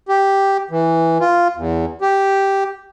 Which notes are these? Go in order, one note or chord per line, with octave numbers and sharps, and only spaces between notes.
G4
E3
F4
E2
G4